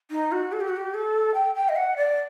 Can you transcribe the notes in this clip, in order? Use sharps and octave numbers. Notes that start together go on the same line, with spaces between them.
D#4
F#4
A4
G4
F#4
G4
A4
G5
G5
D#5
F#5
D5